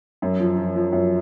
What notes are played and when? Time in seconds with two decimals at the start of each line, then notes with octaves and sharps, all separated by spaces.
0.22 F#2
0.40 F3
0.58 F3
0.76 F3
0.93 F#2